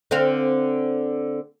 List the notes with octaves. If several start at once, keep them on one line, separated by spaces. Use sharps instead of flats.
D3 C4 F5